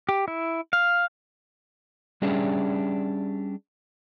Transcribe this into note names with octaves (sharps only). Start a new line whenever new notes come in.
G4
E4
F5
G3 C#4 D4 G4 G#4 E5